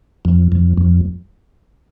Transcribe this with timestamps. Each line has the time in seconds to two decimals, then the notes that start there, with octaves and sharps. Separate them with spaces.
0.25 F2
0.52 F2
0.77 F2